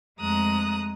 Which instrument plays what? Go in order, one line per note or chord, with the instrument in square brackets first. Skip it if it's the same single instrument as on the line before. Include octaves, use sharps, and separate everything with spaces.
[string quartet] F2 G#3 A3 A#5 D#6 F#6